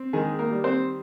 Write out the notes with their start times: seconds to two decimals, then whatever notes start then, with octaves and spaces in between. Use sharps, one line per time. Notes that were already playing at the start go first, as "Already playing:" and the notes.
Already playing: C4
0.13 D#3 G#3 G#4
0.39 A#3 A#4
0.51 G3
0.64 C4 C5